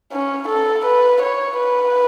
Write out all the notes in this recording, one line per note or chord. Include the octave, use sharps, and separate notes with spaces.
C#4
A4
B4
C#5
B4